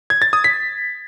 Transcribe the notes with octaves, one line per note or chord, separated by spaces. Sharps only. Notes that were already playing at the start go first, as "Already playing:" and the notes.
G#6
A6
D#6
B6